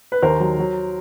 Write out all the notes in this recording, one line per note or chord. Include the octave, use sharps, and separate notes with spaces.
B4
D#2 A#4 C5
F#3
F#3